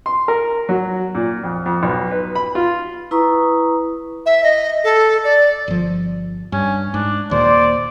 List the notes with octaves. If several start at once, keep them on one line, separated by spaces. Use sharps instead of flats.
C6
A#4
F#3
A#2
F2
F2
B1
B4
B5
F4
E4 B4 A#5 C#6 D#6
E5
D#5
A4
D5
G1 F3
G2 C#4
G#2 D4
D#2 A#2 C5 D5